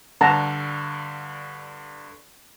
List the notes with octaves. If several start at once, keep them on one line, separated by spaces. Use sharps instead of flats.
G2 D3 F#5 A5 A#5